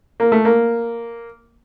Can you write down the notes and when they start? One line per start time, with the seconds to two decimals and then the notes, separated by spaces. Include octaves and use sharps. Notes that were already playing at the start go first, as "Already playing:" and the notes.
0.20 A#3
0.32 A3
0.45 A#3